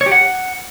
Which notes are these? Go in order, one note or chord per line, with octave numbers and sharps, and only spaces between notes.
C#5
G4
F#5